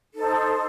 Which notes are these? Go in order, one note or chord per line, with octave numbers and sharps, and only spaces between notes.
D#4 A4 C5